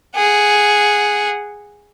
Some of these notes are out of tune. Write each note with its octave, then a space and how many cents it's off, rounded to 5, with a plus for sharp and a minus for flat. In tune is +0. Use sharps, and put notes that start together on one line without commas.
G#4 +0 F#5 +0